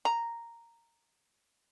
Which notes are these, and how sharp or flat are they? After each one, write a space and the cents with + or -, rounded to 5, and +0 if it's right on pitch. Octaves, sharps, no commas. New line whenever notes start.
A#5 -5